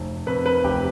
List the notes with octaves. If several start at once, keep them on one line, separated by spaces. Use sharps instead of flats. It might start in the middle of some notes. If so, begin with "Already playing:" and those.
Already playing: F1
F2 B4
B4
F1 G4